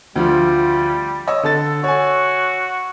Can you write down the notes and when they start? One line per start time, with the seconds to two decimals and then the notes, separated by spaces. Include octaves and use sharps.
0.16 D2 F3 G3 F4
1.27 C#5 D#5 E6
1.43 D3 A4 A6
1.84 F#4 C#5 G#5